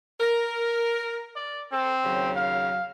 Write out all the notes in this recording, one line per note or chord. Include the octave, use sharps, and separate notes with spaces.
A#4
D5
C4 A4
D#2 C#3 F#3
F5